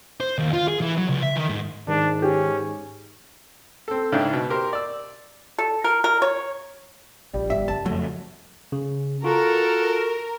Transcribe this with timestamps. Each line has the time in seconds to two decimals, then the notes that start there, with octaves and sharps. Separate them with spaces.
0.21 C5
0.38 D#2
0.53 F4
0.68 G#4
0.81 E3
0.97 F#3
1.09 C#2
1.23 E5
1.36 D#3
1.49 G#2
1.88 G#2 D#3 D4
2.22 C#4 G4
3.88 C4 A4
4.12 G#2 C#3 D4 E4 G5
4.33 B2
4.50 G4 A#4 C5
4.73 D5 E6
5.58 A4
5.84 A#4
6.04 A#4
6.22 C#5
7.34 A#1 G3
7.50 G1 E5
7.68 F#2 C#3 A5
7.86 F2 F#3 A3
8.72 C#3
9.24 F4 F#4 A4 A#4